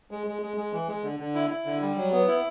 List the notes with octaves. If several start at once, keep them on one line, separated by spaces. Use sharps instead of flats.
G#3
G#3
G#3
G#3
E3
G#3
D3
D3
E4
E4
D3
G3
F#3
B3
E4